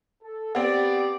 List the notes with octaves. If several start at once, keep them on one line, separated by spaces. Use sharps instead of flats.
A4
B3 C4 G4 D5